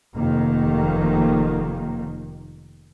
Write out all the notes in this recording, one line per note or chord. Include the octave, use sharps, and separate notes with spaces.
F1 D#3 A#3